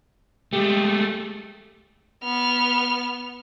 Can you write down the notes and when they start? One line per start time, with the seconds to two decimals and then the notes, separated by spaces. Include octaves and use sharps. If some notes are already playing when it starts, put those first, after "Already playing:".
0.53 G#3 A3 G4
2.24 B3 F6